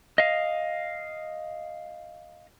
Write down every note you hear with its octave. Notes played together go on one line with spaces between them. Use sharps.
D#5 F5